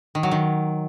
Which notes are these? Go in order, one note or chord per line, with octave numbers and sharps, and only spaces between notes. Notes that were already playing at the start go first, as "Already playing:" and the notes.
D#3
F#3
D#3